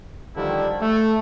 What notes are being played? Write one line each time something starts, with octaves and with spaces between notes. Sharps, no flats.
D3 D#3 F3 G3 D4 E4
A3